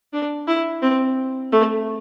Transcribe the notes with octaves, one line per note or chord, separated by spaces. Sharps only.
D4
E4
C4
A3